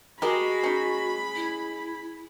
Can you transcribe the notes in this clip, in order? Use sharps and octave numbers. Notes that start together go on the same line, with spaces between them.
G#3 F#4 G4 A#4 D#5 B5
C#4 D#4
E4